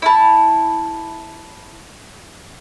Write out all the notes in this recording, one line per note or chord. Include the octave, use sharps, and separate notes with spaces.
E4 A5